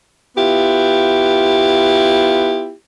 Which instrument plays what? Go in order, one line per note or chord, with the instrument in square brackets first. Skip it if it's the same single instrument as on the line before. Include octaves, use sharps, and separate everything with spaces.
[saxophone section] B3 E4 F4 G4